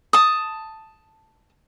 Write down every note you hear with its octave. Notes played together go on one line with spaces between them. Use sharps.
A5 D#6